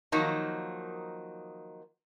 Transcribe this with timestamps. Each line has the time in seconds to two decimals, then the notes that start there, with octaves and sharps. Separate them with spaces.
0.12 D#3 F3 F#3 A#3 D#4